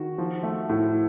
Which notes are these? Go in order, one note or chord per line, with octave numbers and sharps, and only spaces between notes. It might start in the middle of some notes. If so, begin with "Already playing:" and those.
Already playing: D#3 F#4
F3
A3
A2